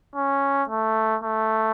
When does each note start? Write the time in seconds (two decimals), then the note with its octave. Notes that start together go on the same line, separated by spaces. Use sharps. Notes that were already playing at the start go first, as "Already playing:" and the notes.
0.15 C#4
0.69 A3
1.23 A3